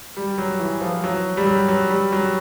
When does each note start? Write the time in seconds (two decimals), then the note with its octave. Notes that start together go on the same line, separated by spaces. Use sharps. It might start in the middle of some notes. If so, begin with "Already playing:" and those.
0.17 G3
0.38 F#3
0.60 E3
0.81 F3
1.04 F#3
1.37 G3
1.46 F#3
1.68 F#3
1.90 G3
2.12 F#3